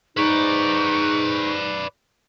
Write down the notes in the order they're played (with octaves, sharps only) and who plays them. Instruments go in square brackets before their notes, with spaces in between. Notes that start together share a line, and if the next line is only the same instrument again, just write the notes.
[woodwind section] G#2 D#4 [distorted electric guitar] B4 D5 [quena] C#6